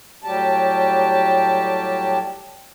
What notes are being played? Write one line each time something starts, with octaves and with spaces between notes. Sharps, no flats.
A2 F#3 G3 G4 A5